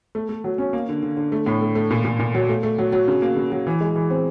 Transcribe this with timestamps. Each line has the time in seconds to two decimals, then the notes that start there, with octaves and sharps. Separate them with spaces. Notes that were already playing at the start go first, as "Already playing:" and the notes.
0.15 A3
0.29 A3
0.44 F#3
0.58 C#4
0.73 A#3
0.89 D3
1.03 D3
1.17 D3
1.32 A3
1.46 A2
1.62 A3
1.75 A3
1.91 A#2
2.05 A#2
2.19 A#2
2.35 F#3
2.49 A3
2.63 A3
2.78 F#3
2.92 F#3
3.08 C#3
3.22 A#3
3.36 C#3
3.52 F#3
3.67 E3
3.81 G#3
3.96 E3
4.10 C4